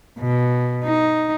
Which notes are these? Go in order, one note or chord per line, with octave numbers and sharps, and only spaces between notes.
B2
D#4